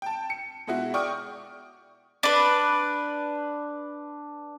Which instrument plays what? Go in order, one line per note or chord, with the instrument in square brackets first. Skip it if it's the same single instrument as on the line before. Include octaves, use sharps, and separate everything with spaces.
[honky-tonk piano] G5 A5
C#7
B2 G#3 E4 F#4
D5 G5 C#6 D#6 F6
[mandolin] D4 B4